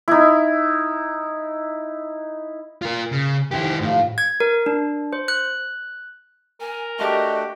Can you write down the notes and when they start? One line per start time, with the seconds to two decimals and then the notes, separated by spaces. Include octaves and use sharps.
0.08 D#4 E4
2.82 F4 A#4
3.12 C#3
3.51 F1 D#3 E4 G4
3.81 A2 F4
4.18 G#6
4.40 A#4
4.66 D4
5.13 C5
5.28 F#6
6.61 A#4 G#5
6.99 A3 D4 F#4 G4 D#5